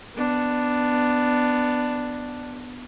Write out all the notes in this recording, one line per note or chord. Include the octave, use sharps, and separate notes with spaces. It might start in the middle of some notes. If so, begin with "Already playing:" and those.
B3 D4